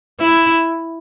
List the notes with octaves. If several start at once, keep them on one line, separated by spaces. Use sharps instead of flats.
E4